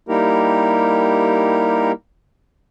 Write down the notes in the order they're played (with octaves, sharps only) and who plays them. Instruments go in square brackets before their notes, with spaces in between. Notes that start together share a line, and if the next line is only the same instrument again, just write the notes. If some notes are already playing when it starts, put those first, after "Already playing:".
[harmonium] G3 A#3 D#4 E4 G4 A#4